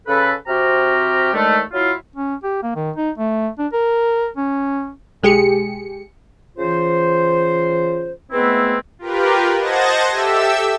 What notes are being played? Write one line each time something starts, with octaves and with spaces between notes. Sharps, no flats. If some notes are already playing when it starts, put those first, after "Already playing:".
C#3 A4 B4
C3 C4 F#4 G4 A#5 F6
D#2 D3 G#3 A3
F#3 E4 F4
C#4
G4
A#3
D#3
D#4
A3
D4
A#4
C#4
B1 G#3 G4 G#4 C#7
C#3 E3 F4 C5
G#3 A3 B3 C4 E4 B4
F4 G4 A#4 B4
C5 D#5 F#5 A5 G#6 A#6
G4 A4 E5 E6